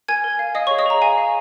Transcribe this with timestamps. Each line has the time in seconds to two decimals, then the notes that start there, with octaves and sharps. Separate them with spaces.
0.08 A#4 G#5 G#6
0.24 A#4
0.39 F5
0.55 D#5 F5 D#6
0.67 G#4 C#5 C#6
0.79 D#5 D#6
0.86 G#4 A#5
1.02 F5 G#5
1.18 F5